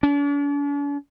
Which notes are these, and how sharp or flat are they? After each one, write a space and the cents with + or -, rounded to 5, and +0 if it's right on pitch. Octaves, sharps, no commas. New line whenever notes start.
D4 -45